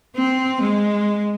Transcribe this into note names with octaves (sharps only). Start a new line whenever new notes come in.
C4
G#3